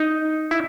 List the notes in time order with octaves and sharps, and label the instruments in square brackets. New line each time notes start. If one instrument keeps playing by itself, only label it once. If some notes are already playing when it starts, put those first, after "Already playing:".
Already playing: [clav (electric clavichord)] D#4
E4